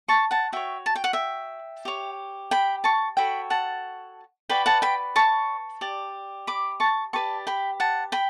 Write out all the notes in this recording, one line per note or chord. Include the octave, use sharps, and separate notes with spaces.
A5 C#6
F#5 A5
F#4 C#5 E5 G5
A5
G5
F#5
E5 G5
G4 C#5
G5 B5
A5 C#6
F#4 A4 C#5 G5 B5
F#5 A5
F#4 B4 D5 G5 B5
F#5 A5
G5 B5
A5 C#6
G4 D5
B5 D6
A5 C#6
G4 B4 D5 A5 C#6
G5 B5
F#5 A5
G5 B5